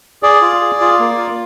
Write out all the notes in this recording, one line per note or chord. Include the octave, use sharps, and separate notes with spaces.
G#4 D5
F4
G#4
F4
A#3
F4